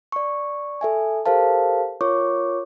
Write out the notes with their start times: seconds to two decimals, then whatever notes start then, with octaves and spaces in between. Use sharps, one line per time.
0.12 D5 C#6
0.81 A4 E5 G#5
1.26 G4 A4 A#4 C5 F5 A5
2.01 F4 A#4 C#5 C#6 D6